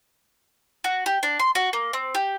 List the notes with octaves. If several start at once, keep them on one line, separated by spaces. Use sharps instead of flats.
F#4
G4
D4
C6
F#4
A#3
C4
G4